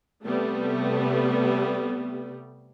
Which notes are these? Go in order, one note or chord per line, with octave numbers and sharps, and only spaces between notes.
C3 G3 A3 B3